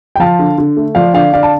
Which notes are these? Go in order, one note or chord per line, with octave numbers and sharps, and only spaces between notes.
G5
F3 F5 A5
D3
D3
A3
F3 D5 F5
D3 D5 F5
D3 D5 F5
A5